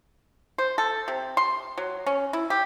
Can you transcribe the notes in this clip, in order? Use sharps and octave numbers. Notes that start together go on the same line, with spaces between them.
C5
A4
C3
C6
F#3
C#4
E4
G4